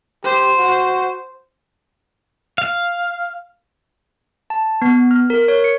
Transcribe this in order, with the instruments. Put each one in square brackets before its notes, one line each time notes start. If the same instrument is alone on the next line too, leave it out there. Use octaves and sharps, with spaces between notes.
[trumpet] G4 [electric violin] C5
[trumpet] F#4
[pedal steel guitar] F5
[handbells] A5
B3
F6
A#4
C#5
C#7